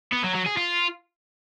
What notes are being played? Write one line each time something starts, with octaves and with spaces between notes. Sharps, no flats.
B3
F#3
F#3
G#4
F4